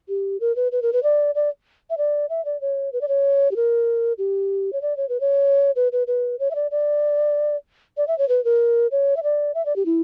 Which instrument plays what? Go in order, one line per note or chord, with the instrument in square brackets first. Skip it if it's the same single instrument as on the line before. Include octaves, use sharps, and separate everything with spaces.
[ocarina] G4
A#4
B4
B4
A#4
B4
D5
D5
E5
D5
E5
D5
C#5
B4
D5
C#5
G4
A#4
G4
C#5
D5
C#5
B4
C#5
B4
B4
B4
C#5
E5
D5
D5
D5
E5
C#5
B4
A#4
C#5
E5
D5
E5
D5
G4
E4